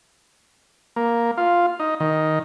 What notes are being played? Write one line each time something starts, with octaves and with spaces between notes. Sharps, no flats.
A#3
F4
D#4
D#3